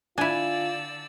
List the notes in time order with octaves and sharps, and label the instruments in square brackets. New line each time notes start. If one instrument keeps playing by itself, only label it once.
[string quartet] D3 D5 E6 [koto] D4 E4 [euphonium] F4 [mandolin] G#5